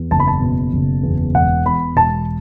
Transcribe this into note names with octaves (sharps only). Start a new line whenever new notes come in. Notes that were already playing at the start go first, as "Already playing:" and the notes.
Already playing: E2
F#1 A5
B5
A5
B2
F#1
E2
E1 F#5
E2 B5
E1 A5